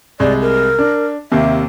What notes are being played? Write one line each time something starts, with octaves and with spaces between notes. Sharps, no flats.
C2 G#3 D5
A#4
D4
D#2 C3 A#3 E5